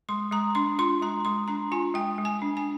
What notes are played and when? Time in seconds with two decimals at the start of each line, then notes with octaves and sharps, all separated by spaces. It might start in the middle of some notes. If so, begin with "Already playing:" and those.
0.09 G#3 C6
0.31 G#3 A#5
0.55 D4 C6
0.79 F4 C6
1.01 G#3 A#5
1.25 G#3 C6
1.48 D4 A#5
1.72 F4 G#5
1.94 G#3 G5
2.18 G#3
2.25 G#5
2.42 D4
2.57 G#5